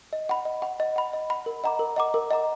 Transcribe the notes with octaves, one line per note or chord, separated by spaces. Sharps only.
D#5
F#5 B5
D#5
F#5 B5
D#5
F#5 B5
D#5
F#5 B5
A#4
D#5 F#5 A#5 D6
A#4
D#5 F#5 A#5 D6
A#4
D#5 F#5 A#5 D6